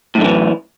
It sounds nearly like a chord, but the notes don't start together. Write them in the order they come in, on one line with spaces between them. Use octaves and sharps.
A2 F#2 D3 E3